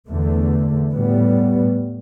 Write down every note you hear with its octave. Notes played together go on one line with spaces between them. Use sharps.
E2 D3 A3
A2 G3 B3